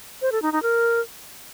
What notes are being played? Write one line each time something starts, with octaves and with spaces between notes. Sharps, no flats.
C5
A4
D#4
D#4
A#4